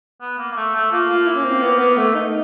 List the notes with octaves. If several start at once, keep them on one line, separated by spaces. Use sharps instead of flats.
B3
A#3
A#3
A3
A3
A#3 F4
F4
E4
C#4
C4
B3
B3
A3
D#4